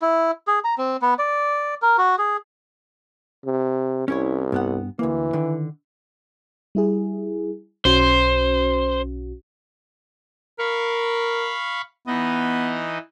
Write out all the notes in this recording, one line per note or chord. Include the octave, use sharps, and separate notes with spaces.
E4
G#4
A#5
C4
B3
D5
A#4
F#4
G#4
C3
C2 C#4 E4 C#5
G2 B3 F#5
D2 E3 A#3
D3 D#3
G3 E4 G#4
B1 C#4 F#4 C5
A#4 F5 B5 C#6
E3 B3 D#4 D#5